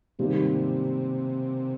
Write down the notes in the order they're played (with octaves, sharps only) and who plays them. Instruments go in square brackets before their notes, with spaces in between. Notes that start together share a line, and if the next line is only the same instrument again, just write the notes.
[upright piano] G#2 D#3 G3 A#3 [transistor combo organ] C3